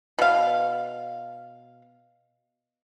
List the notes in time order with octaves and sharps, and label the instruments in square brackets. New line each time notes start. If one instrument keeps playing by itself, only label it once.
[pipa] B2 F5